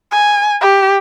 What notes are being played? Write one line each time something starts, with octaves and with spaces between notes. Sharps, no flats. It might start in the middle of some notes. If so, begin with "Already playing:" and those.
G#5
G4